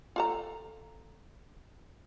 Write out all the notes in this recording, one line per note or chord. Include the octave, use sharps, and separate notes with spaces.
F4 A4 A#5